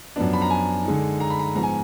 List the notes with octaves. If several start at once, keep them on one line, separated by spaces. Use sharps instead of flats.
F#2 F3 B3 D4
B5
A#5
G#5
D3 G#3 D#4
A#5
B5
A#5
G#2 F3 B3 A#5
G#5